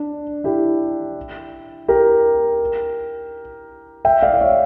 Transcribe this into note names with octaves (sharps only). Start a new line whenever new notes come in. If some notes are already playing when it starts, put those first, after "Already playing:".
Already playing: D4
E4 G4
G4 A#4
E5 G5
D5 F5
F5
C#5 E5